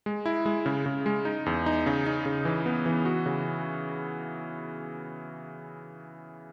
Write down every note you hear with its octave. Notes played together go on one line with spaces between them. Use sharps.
G#3
E4
G#3
C#3
C#3
G#3
D#4
E2
D#4
C#3
D#4
C#3
E3
B3
E3
F#4
C#3